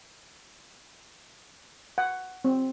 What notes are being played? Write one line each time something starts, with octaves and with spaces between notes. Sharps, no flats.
F#5
C4